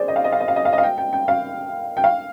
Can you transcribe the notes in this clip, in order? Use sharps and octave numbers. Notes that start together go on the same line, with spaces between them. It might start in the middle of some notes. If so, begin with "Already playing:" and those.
Already playing: G#4 C5 D5
D#5
F5
D#5
F5
D#5
F5
D#5
F5
D#5
F5
G5
G5
G5
F5
G5
F5